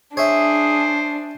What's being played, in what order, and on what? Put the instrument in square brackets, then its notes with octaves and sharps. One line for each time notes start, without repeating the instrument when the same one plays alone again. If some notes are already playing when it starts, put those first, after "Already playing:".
[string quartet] D4 [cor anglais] G#4 [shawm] C5 [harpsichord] C#5 E5